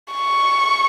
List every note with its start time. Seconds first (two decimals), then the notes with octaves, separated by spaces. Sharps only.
0.14 C#6